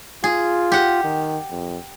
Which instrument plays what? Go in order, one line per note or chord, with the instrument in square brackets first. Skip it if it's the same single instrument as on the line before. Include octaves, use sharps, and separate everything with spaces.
[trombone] F4 [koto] G#4
[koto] G4 F#5
[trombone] D#3
F2